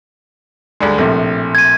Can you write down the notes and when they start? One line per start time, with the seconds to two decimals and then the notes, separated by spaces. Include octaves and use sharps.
0.80 D2 G3 G#3
0.98 A#1 A2 C3
1.55 G#6 D#7